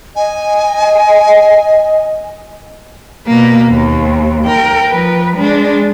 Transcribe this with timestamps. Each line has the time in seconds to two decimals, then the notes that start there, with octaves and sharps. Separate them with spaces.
0.16 D#5 G#5
3.27 B2 A#3
3.69 D#2
4.45 A#4 G5
4.89 F3 B4
5.37 G#3 D4